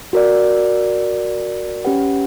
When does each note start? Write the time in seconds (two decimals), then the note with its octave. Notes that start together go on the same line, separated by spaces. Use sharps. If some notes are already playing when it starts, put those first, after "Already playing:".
0.13 F#4 A#4 D5
1.85 C#4 G4 B4 F#5